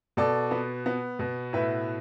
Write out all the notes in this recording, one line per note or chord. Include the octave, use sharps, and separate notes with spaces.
B2 A4 D5
B3
B3
B2
A2 B4 E5